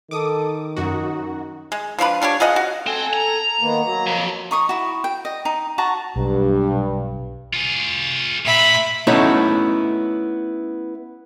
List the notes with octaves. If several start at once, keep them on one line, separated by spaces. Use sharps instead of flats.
D#3 A4 D6 D#6
F#2 D#4 F#4
G#3
F3 D4 F4 B4
F3 D4 G4 C#5
F4 G#4 D#5 F#5
F#4
C4 A4 G#5
A#5
D#3 A#3 B3
F#3 A#3
F2
D#4 C#6 D#6
E4 F#4
G5
D#5
D#4
F#4 A5 A#5
B1 G2
F4 G#4
A#2 E5 B5
A3 B3 C#4 D#4 E4 F#4